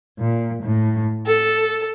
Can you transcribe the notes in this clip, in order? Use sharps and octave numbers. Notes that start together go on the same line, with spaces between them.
A#2
A2
A4